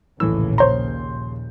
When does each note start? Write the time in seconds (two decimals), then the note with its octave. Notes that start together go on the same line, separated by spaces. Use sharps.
0.20 A#1 D#2 A2 C#3 E3 E6
0.58 C5 C#5 A#5 C6 G6